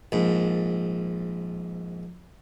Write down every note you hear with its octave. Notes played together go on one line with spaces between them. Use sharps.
A#1 G#2